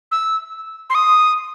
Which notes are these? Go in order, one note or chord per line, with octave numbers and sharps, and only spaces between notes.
E6
C6
D#6